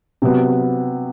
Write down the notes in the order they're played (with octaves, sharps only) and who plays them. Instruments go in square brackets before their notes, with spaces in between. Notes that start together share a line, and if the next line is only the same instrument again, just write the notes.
[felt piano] C3 F#3 B3